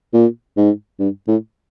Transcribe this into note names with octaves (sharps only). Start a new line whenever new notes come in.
A#2
G#2
G2
A2